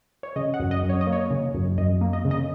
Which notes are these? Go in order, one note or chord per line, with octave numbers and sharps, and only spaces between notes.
C#5
C#3 D#5
F#5
F#2
D#5
F#2
C#5
D#5
A#3
C#5
C#3
F#2
F#2 D#5
A#3
D#5
C#3
D#5